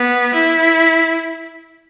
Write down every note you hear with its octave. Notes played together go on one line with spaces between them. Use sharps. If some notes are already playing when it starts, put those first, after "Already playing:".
Already playing: B3
E4